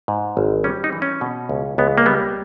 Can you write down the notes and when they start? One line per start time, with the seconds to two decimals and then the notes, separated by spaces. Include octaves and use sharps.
0.08 G#2
0.37 G#1
0.64 G3 C#4
0.84 D#4
0.93 E3
1.02 C#4
1.21 B2
1.49 C#2
1.78 C#2 B3
1.98 A#3
2.06 G3 B3